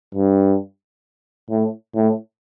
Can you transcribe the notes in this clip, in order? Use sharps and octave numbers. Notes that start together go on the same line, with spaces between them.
G2
A2
A2